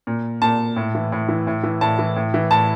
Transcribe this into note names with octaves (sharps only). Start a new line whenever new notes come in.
A#2
A#2 A5
A2
E3
A2
E3
A2
E3
A2 A5
E3
A2
E3
A2 A5